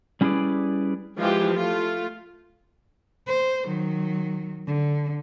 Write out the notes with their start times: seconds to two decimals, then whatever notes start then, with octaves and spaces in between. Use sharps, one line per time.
0.21 G3 C#4 E4 G#4 B4 D5
1.19 E3 F3 G#3 F4 G4
1.54 A3 F4
3.27 C5
3.65 D#3 F#3
4.66 D3